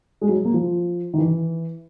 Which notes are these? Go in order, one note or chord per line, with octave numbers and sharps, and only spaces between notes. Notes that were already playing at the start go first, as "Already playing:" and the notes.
G#3
F#3
A#3
F3
D#3
E3